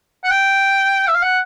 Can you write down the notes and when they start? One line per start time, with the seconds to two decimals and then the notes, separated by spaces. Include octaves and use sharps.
0.24 F#5
0.30 G5
1.08 E5
1.15 F5
1.23 F#5